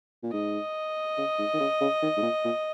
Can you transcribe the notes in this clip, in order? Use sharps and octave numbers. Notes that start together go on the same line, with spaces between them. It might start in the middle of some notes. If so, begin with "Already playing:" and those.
A#2
G#2 D#5
C#3
G#2
D#3
C#3
C#3
D#3
G#2
A#2
A#2